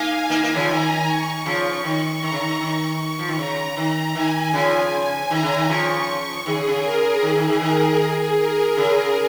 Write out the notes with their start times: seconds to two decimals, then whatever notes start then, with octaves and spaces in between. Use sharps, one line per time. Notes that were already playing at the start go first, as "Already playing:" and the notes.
Already playing: A#3 D#4 F5 G#5
0.30 A#3 D#4
0.43 A#3 D#4
0.52 D#3
0.56 C#3 F3
0.68 D#3 A#5
1.07 C#6
1.45 C#3 F3
1.84 D#3 C#6
2.22 D#3 A#5
2.32 C#3
2.41 D#3
2.60 D#3 C#6
2.99 C#6
3.19 F3
3.28 D#3
3.38 C#3 A#5
3.77 D#3
4.15 D#3 G#5
4.53 C#3 F3
4.92 G#5
5.30 D#3 A#5
5.43 C#3
5.56 D#3
5.69 C#3 F3 C#6
6.46 D#3 G#4
6.53 C#3
6.67 C#3
6.84 A#4
7.23 D#3 G#4
7.35 D#3
7.48 D#3
7.61 D#3 A#4
8.00 G#4
8.38 A#4
8.77 C#3